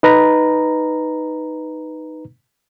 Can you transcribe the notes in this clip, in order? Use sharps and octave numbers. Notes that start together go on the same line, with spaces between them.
D#4 B4 A#5